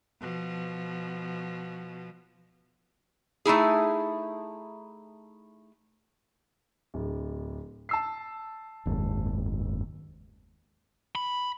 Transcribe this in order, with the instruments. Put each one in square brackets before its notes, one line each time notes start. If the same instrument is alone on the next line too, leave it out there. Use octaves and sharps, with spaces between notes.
[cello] B2 F3
[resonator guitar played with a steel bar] A3 D#4 E4 G#4
[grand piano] D1
A5 E6 C7
[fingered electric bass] F#1 D#2 G#2
[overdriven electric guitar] B5